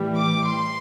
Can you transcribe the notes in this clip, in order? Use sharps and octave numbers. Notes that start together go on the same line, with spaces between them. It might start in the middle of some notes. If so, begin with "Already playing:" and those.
Already playing: A2 E3 G3
D6
C6